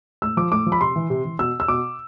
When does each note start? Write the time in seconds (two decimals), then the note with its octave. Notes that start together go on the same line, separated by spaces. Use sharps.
0.22 A2 E6
0.37 F3 D6
0.52 A2 D6
0.66 F3
0.72 B5
0.81 C3 C6
0.96 E3
1.10 C3
1.25 E3
1.39 B2 E6
1.60 E6
1.68 B2 D6